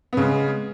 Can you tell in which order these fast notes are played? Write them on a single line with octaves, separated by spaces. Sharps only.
B3 C#3 G#3